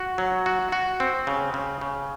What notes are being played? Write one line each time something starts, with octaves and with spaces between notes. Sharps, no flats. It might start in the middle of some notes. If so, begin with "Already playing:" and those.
Already playing: F#4
F#3
F#4
F#4
C4
C#3
C#3
C#3